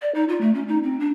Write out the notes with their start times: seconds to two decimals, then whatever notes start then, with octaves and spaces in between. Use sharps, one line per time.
0.02 D5
0.15 D#4
0.29 F4
0.41 A3
0.54 C#4
0.68 D#4
0.83 C4
1.00 D4